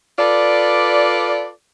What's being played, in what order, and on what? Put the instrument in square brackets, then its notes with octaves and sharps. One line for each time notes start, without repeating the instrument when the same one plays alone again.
[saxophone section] F4 A4 B4 D5